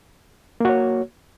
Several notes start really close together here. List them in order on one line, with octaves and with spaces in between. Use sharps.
A#3 F#4 C#5